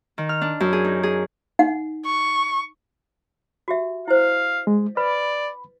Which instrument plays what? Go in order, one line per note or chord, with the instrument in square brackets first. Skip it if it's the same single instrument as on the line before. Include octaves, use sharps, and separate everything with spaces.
[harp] D#3
F6
D4
F#2
G#4
D#4
G#4
[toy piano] D#4 F#5
[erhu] C#6
[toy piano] F#4 G4 E5
[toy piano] E4 C5 [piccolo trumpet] F5
[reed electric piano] G#3
[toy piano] B4 [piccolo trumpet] D5 [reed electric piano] B5